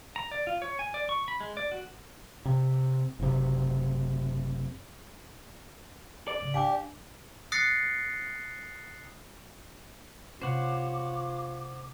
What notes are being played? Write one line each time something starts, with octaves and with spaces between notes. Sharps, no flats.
A#5
D5
F4
C#5
G#5
D5
C#6
B5
G#3
D5
F#4
C3
F#1 C3
D5
G#2 C#3
D4 G4 F5 G#5 D6
D#6 F#6 A6 A#6 C7 C#7
C3 C#4 F4 C5 C#5 F#5 D6